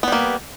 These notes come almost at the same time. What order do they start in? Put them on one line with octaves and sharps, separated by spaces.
B3 G3 A#3